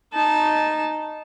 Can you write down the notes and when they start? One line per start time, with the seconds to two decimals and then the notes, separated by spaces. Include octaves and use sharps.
0.14 D#4 A5